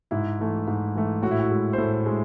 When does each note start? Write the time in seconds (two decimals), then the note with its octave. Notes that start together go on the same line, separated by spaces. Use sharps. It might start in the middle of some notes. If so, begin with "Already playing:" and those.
0.11 G#2 E4
0.40 E3 A3
0.68 G#2
0.96 E3 A3
1.22 A2 F#4
1.31 E4
1.40 F#4
1.51 G#3
1.73 C5
1.78 A2 A4
2.06 G#3